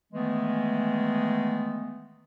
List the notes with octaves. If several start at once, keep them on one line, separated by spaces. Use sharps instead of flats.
D#3 E3 G#3 A3 B3